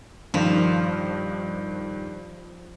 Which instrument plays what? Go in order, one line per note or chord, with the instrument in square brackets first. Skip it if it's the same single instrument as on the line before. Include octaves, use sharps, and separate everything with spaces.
[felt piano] G2 D#3 [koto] F3